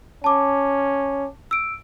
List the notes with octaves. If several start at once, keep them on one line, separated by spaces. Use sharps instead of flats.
C#4 A5 D6
E6 D7